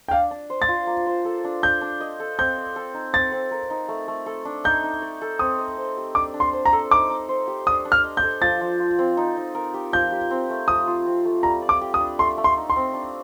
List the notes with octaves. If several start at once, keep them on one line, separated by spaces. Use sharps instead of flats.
G5
D4 F5
D4
C5
A6
F4
A#3
C5
A4
D4
D4 G6
D4
D#5
A4
C4 G6
D5
A4
D#4
C4 A6
C4
A#4
D#4
A3
A3
A4
D4
D#4 G6
D#4
D5
A4
C4 D#6
D#5
C5
G4
D4 D6
D4
C6
C5
A#5
A4
D#4 D6
D#4
C5
G4
D4 D#6
D4
F6
D#5
G6
A4
F3 A6
F3
F4
C4
D#4
D#4
A#4
G4
F3 G6
G4
C4
A3
F3 D#6
F4
C4
A3
G3 A#5
D5
D6
G4
D#6
D4
A3 C6
A3
C6
D#4
C6
C4
D4